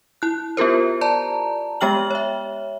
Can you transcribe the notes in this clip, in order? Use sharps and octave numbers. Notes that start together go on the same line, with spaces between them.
E4 F#6
B3 F4 G4 A#4 C5
D5 A5 A#5
G#3 B3 G4 G5 F6 F#7
C#5 E5